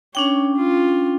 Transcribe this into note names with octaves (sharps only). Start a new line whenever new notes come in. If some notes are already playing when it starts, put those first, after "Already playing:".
C#4 D4 C#5 G5
F4